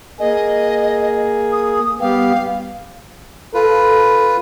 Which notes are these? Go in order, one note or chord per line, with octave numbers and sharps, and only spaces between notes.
A#3 G#4 D#5
D#6
G3 B3 G4 F5
F4 A4 B4